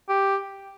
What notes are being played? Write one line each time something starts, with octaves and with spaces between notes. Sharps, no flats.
G4